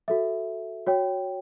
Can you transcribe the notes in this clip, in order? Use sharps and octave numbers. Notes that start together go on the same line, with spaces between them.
F#4 A4 E5
F#4 C#5 G5